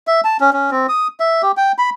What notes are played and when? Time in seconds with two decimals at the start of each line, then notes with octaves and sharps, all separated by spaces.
0.07 E5
0.25 A5
0.40 C#4
0.53 C#4
0.71 C4
0.89 D#6
1.20 E5
1.43 G4
1.57 G5
1.78 B5